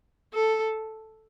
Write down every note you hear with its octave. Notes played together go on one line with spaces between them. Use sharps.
A4